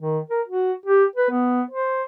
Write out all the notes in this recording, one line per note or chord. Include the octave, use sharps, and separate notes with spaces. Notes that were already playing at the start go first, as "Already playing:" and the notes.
D#3
A#4
F#4
G4
B4
B3
C5